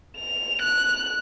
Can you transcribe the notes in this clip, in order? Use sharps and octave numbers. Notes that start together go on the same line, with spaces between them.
F7
F#6